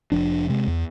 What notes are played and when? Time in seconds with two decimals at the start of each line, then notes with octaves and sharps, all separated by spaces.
0.12 F1 F3 D4
0.49 C3 G#3
0.67 E2